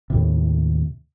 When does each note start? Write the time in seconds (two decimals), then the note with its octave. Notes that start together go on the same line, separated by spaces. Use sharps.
0.10 D#2 A2 C3